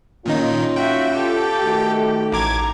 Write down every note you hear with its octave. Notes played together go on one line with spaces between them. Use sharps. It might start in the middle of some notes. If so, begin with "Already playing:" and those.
A#2 D#3 C#4 D#4 F4
F#4 E5 G5
G4 A4
D#3 A3 F#4
A1 A#5 D6 G#6